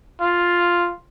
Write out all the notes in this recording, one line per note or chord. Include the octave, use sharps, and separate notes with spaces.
F4